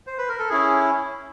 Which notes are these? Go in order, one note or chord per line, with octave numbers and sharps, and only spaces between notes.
C5
B4
A#4
A4
C#4 E4 G#4